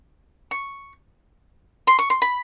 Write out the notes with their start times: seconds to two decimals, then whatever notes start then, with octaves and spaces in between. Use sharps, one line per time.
0.51 C#6
1.87 C6
1.99 C#6
2.10 C6
2.22 B5